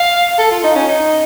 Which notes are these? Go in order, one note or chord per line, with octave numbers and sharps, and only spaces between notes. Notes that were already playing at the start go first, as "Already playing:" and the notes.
Already playing: F5
A4
F4
D#4
C#4
D#4